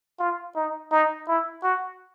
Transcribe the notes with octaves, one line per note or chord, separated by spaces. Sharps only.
F4
D#4
D#4
E4
F#4